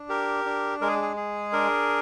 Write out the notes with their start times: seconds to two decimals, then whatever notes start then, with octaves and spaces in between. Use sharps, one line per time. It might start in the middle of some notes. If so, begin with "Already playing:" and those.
Already playing: D4
0.09 G4 A#4
0.46 D4
0.81 G#3 A#4
0.88 G#4
1.02 G#4
1.17 G#4
1.53 D4 A#4